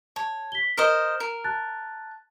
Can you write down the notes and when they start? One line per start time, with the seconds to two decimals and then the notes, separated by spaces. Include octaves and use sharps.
0.16 C#5 A5
0.52 B6 G7
0.77 A#4 C5 D#5 F6 E7
1.20 A#4
1.44 A5 F#6 A6